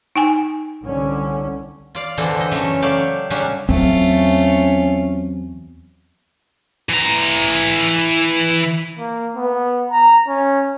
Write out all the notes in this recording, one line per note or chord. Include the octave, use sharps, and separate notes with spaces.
D#4 G5 G#5
C2 D3 C#4
F4 D5 F5
E2 D3 E3 D4 A4 C5
G4 D#5
F#2 C#3 E3 A3 C#4
F#3 A3 G4 C#5 D5 F5
C#3 F#3 G3 C#4 D4
E2 F#3 A3 C4 C#4 F4
E3 A#5
A#3
B3
A#5
C#4